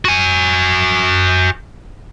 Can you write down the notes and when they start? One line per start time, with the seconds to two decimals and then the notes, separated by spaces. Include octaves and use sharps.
0.05 F#4 G#5